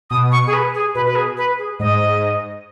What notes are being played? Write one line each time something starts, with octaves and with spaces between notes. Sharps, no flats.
B2 D#6
C#6
G#4
B4
G#4
B2 B4
B4
G#4
B4
G#4
G#2 D#5